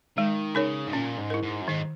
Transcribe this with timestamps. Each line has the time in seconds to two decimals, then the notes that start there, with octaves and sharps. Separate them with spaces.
0.17 D#3 G#3
0.55 C#3 D#4 A#4 C#5
0.87 G#2
0.93 A#2 C#4
1.18 G#2
1.30 E4 A#4
1.43 G#2
1.61 F#2
1.68 G#2 D#3